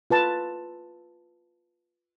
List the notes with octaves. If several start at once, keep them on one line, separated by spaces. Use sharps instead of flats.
F4 B4 A5